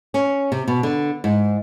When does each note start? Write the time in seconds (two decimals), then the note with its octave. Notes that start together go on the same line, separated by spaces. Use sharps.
0.14 C#4
0.52 C3
0.68 B2
0.83 D3
1.24 G#2